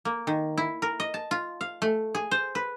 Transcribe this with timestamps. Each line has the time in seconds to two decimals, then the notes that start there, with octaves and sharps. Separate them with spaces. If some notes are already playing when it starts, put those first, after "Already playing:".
0.05 A#3
0.27 D#3
0.57 E4
0.82 A#4
1.00 D#5
1.14 A5
1.31 F4
1.61 F5
1.82 A3
2.15 G#4
2.31 C5
2.55 B4